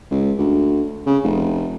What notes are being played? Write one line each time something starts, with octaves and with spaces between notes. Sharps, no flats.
C#2
D2
C#3
F1